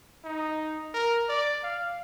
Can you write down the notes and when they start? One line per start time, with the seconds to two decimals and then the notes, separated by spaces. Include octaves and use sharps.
0.24 D#4
0.94 A#4
1.29 D5
1.63 F5